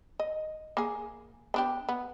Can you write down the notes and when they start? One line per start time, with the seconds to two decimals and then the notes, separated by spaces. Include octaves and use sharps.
0.20 D#5
0.77 A#3 G#4
1.54 B3 D4 G4
1.89 B3